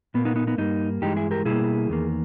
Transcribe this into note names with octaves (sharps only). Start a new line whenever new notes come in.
A#2 A#3 B3
B3 D#4
B3 D#4
B3 D#4
G2 G3 A#3 B3 D#4
G2 E3 G#3 D#4 G4
E4 G#4
G4 A#4
B2 G3 A#3 E4 G#4
E2 D#3 A#3